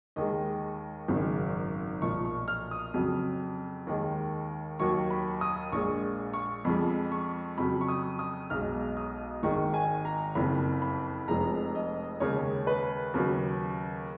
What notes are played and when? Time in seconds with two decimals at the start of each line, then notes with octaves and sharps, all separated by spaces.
0.16 D#2 D#3 G#3 D#5
1.08 G#1 F#2 C#3 G#3
2.02 B1 A#2 F3 C#6
2.25 C#6
2.48 F6
2.71 D#6
2.94 F2 C#3 F#3
3.87 D#2 D#3 G#3
4.80 D#2 D#3 F#3 C#6
5.10 B5
5.41 D#6
5.72 A#1 A#2 G#3 C#6
6.33 C#6
6.65 F2 F3 G#3 B5
7.12 C#6
7.58 F2 C#3 F#3 B5
7.81 C#6
7.88 D#6
8.19 D#6
8.50 B1 B2 G#3 F6
8.97 D#6
9.43 G#1 G#2 D#3 G#3 C#6
9.74 G#5
10.05 A#5
10.35 F#1 F2 C#3 B5
10.82 B5
11.28 F1 F2 F3 G#3 A#5
11.75 D#5
12.20 D#2 C#3 G#3 C#5
12.67 B4
13.14 D#2 C#3 F#3